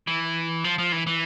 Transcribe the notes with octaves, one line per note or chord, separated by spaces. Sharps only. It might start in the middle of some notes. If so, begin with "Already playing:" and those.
E3
F3
F3
E3
E3